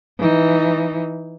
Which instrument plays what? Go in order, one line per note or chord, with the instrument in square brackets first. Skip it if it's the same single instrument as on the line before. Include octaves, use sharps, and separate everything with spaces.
[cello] E3 D#4